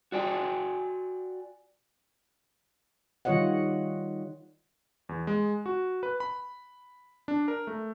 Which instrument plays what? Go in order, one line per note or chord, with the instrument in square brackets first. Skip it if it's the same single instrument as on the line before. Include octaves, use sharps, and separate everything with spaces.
[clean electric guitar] F#4 D5 G5 G#5
[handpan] D#3 G3 F4 C#5 D#5 F#5
[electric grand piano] E2
G#3
F#4
B4
B5
D4
A#4
A3